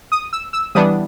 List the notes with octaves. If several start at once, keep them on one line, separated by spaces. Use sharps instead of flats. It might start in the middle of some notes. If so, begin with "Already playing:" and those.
D#6
E6
E6
E3 G3 B3 D4 D#6